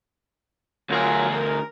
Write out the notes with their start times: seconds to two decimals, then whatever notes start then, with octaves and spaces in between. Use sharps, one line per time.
0.90 D2 F#3 F4 G#4 A#4
1.29 A#4